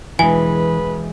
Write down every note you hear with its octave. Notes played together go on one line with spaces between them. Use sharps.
E1 E3 G#3 B4 G#5